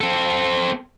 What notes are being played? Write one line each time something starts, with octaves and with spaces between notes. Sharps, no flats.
C4 A4